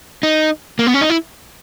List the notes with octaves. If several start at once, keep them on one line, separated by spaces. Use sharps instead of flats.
D#4
A#3
B3
C#4
D#4
E4